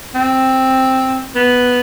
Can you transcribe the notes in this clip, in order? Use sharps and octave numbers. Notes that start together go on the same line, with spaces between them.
C4
B3